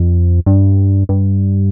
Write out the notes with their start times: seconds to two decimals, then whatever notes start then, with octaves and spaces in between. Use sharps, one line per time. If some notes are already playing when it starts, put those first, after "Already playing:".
Already playing: F2
0.46 G2
1.09 G2